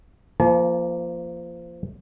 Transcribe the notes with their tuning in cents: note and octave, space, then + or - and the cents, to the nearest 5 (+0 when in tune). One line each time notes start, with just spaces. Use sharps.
F3 -30 A#3 +0 A5 -40